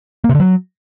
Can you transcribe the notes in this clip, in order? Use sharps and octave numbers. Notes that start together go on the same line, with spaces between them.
A#3
C3
D3
F#3